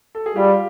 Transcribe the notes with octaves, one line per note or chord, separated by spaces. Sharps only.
A4
G#4
G3 F4 G4